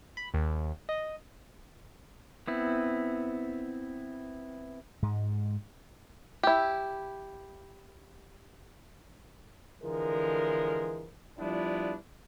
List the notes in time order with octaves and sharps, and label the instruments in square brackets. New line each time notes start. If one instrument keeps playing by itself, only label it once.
[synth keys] B5
D#2
D#5
[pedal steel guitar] B3 C4 E4
[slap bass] G#2 G#3
[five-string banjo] E4 G4
[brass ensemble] D3 E3 F3 G#3 A#4
F3 G3 B3 D4 E4 F4